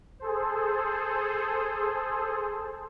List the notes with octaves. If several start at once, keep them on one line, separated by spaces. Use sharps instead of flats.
G#4 A4 C5